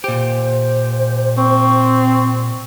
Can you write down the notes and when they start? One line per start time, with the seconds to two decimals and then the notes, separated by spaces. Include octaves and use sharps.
0.04 A#2 G4 C5
1.37 C4 C#6